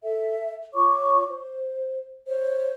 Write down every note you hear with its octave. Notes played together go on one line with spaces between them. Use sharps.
A4 E5
F4 C#5 C#6 D6
C5
C5 C#5